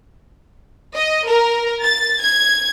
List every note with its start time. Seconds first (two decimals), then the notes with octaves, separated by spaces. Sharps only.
0.94 D#5
1.26 A#4
1.83 A6
2.21 G#6